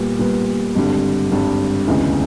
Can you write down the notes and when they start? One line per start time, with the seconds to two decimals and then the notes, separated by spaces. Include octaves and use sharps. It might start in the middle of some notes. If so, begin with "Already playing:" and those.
Already playing: A#2 G3 B3
0.19 A#2 G3 B3
0.75 G#1 G2 D3 G3
1.31 G#1 G2 D3 G3
1.88 E1 D2 C#3 E3 G#3